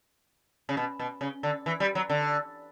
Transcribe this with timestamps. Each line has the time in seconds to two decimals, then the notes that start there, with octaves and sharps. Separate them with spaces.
0.69 C#3
0.77 B2
0.99 B2
1.21 C#3
1.43 D3
1.66 E3
1.80 G3
1.95 F#3
2.09 D3